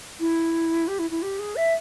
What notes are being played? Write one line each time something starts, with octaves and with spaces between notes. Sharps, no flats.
E4
G4
E4
E4
G4
G#4
E5